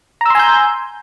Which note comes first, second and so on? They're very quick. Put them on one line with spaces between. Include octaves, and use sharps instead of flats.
A#5 E6 C6 G#5 G6